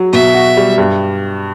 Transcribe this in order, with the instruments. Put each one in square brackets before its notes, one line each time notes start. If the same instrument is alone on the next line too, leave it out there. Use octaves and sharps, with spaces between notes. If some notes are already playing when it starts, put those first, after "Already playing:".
Already playing: [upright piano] F#3
[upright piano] B2 [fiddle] E5
[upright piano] F#4
G3
G2